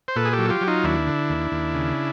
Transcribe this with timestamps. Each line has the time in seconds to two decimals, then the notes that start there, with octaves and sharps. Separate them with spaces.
0.08 C5
0.16 A#2 A4 B4
0.25 G#4
0.33 G4 A4
0.38 F#3
0.50 F4 G4
0.61 F#3
0.67 D#4 F4
0.84 D#2 D4 E4
1.07 D3
1.30 D#2
1.52 D#2
1.74 C#3